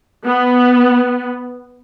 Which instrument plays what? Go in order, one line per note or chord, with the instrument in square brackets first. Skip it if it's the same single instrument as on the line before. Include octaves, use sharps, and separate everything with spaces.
[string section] B3